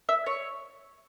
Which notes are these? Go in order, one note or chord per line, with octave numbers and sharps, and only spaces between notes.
E5
C#5